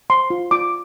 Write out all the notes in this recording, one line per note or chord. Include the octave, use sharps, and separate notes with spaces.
C5 C6
F4
F4 D6